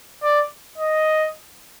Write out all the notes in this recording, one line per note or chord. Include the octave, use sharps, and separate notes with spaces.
D5
D#5